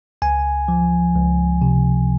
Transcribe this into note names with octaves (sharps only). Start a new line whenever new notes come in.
C#2 G#5
F3
C#2
C3